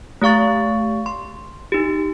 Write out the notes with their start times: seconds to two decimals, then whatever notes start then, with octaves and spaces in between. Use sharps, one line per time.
0.22 A3 G4 F5 C#6 A6
1.06 C6
1.72 D#4 G4